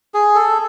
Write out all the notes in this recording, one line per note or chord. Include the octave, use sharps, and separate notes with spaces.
G#4
A4